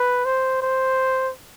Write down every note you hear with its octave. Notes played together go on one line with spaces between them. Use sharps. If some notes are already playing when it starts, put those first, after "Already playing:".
Already playing: B4
C5
C5